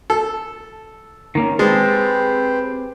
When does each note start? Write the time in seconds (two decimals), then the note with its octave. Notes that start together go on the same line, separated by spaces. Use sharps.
0.10 A4
1.35 D#3 A#3 C#4
1.59 G#3 C4 G4 G#4 B4 C5 A5